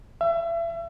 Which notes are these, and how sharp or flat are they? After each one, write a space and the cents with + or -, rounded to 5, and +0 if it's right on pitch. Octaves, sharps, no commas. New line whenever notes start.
E5 +35